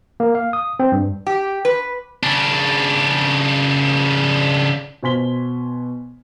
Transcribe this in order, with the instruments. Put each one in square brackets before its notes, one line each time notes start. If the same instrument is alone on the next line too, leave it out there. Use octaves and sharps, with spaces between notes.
[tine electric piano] A#3
F5
D#6
C4
G2
[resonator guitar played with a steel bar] G4
B4
[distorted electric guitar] C#3 D4
[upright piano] B2 C5 G#5 C6 B6 G7